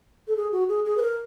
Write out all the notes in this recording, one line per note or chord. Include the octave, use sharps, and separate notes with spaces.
A4
G#4
F#4
G#4
G#4
B4
A#4